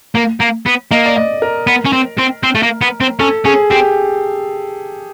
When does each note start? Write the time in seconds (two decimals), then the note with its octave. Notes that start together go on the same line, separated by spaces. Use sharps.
0.15 A#3
0.40 A#3
0.66 B3
0.91 A#3 D#5
1.06 D5
1.16 D#5
1.42 A#4
1.67 B3
1.85 C#4
1.93 C4
2.18 C4
2.43 C4
2.55 A3
2.62 A#3
2.81 B3
3.01 C4
3.20 C#4 A4
3.45 C#4 G#4
3.70 C4 G4